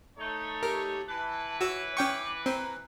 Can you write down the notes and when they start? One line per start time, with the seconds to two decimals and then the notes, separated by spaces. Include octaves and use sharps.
0.18 A3 D#4 C#5
0.63 G4 A#4
1.09 E3 B4 A5
1.61 F#4 C#5 E6
1.97 C#4 G5 C#6 D6
2.46 C4 A#5